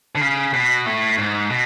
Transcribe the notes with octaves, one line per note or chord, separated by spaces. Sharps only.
D3
C#3
B2
A2
G#2
B2